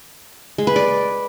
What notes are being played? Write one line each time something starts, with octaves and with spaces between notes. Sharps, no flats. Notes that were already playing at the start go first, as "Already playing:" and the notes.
G#3
B4
D5